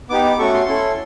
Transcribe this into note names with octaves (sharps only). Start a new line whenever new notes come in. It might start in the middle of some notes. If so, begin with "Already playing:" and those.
B3 D#4 G4 D6
D6
A3 C#4 F#4 A4 C#6
C6
C#4 E4 A4